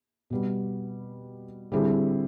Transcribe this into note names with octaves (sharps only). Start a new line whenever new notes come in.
B2 G3 B3
D3 G3 C4 E4 G#4